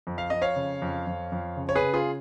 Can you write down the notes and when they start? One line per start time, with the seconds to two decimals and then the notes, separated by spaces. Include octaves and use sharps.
0.07 F2
0.18 F5
0.30 F2 D#5
0.42 C#5 F5
0.56 C#3
0.82 F2
1.07 F2
1.32 F2
1.57 C#3
1.69 C#5
1.75 G#4 B4
1.82 C#3
1.94 F4 G#4